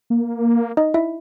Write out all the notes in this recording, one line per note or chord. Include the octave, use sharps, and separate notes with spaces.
A#3
D#4 D#5
E4 E5